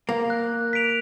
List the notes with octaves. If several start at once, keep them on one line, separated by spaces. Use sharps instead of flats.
A#3
F#6
B6 D7 F7